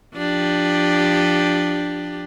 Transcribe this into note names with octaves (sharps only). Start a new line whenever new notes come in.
F3 D4 G4